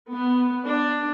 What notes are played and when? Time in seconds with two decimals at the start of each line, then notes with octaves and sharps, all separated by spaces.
0.11 B3
0.69 D4